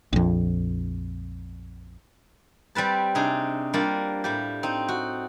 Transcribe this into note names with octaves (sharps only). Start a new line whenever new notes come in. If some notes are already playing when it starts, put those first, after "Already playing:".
A#1 F2
G3 C4 B4 A5
C3 D4 D#4 G#4
G3 A#3 D4 F4
A2 G3 G4
C4 D#4
F#4